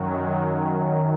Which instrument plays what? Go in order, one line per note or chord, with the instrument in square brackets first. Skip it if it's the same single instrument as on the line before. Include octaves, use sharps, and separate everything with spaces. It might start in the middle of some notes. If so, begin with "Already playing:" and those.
Already playing: [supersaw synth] F#2 D#3 F#3